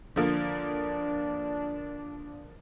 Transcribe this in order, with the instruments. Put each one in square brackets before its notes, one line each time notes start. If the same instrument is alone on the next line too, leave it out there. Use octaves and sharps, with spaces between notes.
[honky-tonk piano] D3 F3 A#3 [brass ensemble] D4